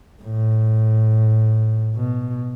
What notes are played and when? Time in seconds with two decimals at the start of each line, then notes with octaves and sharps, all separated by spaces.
0.23 A2
1.96 B2